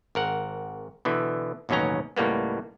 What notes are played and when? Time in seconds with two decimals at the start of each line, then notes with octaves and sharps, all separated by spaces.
0.15 G#1 A#4 F#5
1.05 B2 D3 E3
1.69 A1 D#2 B2 F#3 C#4 A#5
2.17 C#2 A2 G3 A#3 B3